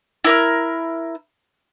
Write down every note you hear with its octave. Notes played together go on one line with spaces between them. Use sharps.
E4 A#4 F6